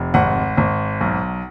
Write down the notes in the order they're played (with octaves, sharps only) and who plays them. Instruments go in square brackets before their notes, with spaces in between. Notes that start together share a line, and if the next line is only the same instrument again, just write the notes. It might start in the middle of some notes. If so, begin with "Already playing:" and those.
Already playing: [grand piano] F1
G#1 F#5
G#1
B1